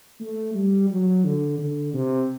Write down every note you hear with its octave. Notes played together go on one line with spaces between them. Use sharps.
A3
G3
F#3
D3
D3
C3